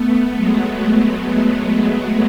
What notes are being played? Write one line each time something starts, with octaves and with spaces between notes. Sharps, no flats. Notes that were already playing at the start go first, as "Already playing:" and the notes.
Already playing: A3 B3
F#3 G#3